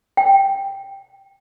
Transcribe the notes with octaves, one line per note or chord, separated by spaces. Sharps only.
G5